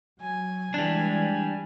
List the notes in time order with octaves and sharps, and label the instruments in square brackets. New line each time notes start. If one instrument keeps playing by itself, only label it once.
[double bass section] F#3 [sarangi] G#5
[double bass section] E3 G#3 [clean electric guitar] G3 D4